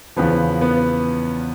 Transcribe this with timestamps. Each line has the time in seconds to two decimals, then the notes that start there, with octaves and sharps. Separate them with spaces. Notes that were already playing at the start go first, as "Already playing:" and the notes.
0.16 E2 C#3 F3 B3
0.61 B3